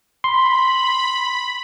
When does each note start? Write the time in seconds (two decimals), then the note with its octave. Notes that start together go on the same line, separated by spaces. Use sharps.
0.24 B5 C6